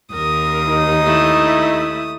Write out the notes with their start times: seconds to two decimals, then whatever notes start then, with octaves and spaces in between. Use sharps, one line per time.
0.13 D#2 A#4 D#6
0.68 D#4
1.04 A3 E4